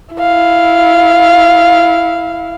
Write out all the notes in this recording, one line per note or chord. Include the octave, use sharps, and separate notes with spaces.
E4 F5